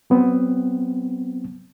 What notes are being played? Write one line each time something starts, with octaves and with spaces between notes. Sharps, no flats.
F#3 B3 C4